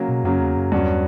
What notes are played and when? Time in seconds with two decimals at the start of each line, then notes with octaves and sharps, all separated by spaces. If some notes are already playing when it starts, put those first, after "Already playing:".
Already playing: C#3 F#3 A#3
0.08 B2
0.24 F#2 C#3 F#3 A#3
0.40 E2
0.57 F#2
0.72 E2 G2 F#3 C#4 F#4